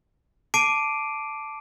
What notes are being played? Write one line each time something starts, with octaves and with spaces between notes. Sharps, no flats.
A5 D6 C7 D7 D#7